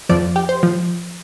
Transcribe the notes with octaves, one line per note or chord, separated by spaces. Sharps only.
F2 F3 D5
G4
C5
F3